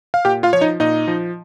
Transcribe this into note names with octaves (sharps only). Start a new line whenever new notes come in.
F5
A#2 G4 G5
F4 F5
F3 C#5
D#4 D#5
A#2 D#4 D#5
F3